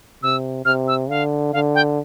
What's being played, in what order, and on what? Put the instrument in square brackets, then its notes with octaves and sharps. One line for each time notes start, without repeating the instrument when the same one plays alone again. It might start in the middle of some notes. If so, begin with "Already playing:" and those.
[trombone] C3 [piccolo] E6
[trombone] C3 [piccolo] F6
[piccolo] E6
[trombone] D3 [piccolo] F5
[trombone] D3 [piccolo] F5
[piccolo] G5